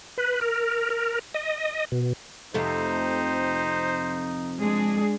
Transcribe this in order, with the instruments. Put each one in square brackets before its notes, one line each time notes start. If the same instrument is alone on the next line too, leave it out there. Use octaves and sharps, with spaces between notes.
[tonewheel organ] B4
A#4
A#4
D#5
B2
[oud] F2 C3 A3 [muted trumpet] D#4 [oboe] C5
[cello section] G#3 D4 G#4